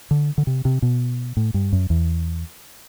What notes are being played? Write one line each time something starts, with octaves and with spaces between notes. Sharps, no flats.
D3
D3
C3
C3
B2
A2
G2
F#2
E2